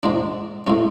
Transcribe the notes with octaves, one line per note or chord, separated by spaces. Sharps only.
G#2 G#3 D4
A2 G#3 C#4